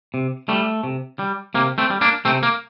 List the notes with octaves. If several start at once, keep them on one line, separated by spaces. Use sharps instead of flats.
C3
G3 A3
C3
G3
C3 A#3
A3 C4
G3
A#3 D4
C3 A3 C4
A#3